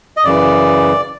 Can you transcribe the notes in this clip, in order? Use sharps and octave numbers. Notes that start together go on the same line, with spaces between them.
D#5
F#2 C#3 E3 D5